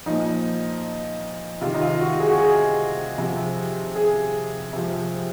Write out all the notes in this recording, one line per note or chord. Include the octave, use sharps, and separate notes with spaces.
A#2 F3 D#4
C3 D#3 F4
D#4
F4
F#4
G#4
F#4
G#4
C3 F3
G#4
C3 F3